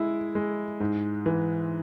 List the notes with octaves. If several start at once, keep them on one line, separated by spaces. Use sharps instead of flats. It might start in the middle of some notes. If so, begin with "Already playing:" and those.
Already playing: G#3 E4
G#3
G#2
E3